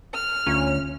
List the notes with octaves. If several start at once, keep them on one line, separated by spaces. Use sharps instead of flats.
F6
D2 C#4 F4 A#5